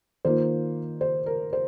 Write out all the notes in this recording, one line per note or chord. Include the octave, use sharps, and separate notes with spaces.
D#3 A#3 F4 C5
C5
A#4
C5